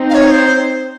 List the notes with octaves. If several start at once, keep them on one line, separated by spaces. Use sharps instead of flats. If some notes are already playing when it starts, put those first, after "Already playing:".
Already playing: C4 D#4
F5
C#5
C5